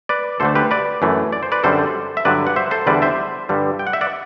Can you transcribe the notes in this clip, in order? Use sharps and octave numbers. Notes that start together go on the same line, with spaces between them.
B4 D5
D2 D3 A3 A4 C5
G4 B4
B4 D5
F#2 E3 A3
D5
C5
B4 D5
F#2 D3 G3 A4 C5
E5
G2 D3 F#3 B4 D5
F#5
C5 E5
A4 C5
E2 D3 G3 B4 D5
C5 E5
G2 D3 G3
G5
F#5
E5
D5 F#5